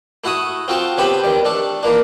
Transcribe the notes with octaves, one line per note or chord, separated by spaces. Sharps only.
A3 E4 F#4 E5 D#6
C4 F4 F#4 A4 G5 A5
C#3 B3 C4 G4 A5 B5
D#3 G3
A3 D4 A4
D#3 E3 A#3 D4